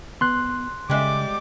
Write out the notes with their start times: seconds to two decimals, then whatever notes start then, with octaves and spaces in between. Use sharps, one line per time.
0.21 B3 C6 F#6
0.90 C#3 G3 G#3 E5 D6